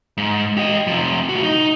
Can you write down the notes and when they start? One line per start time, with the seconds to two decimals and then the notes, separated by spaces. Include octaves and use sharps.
0.17 G#2
0.57 G4 D#5
0.87 C3 F3
1.29 A2 F#4
1.43 D#4